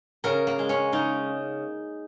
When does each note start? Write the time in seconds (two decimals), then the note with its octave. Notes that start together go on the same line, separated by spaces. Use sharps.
0.24 C#3 A#4
0.47 A#3
0.59 G#3
0.69 C#4
0.93 C#3 D#4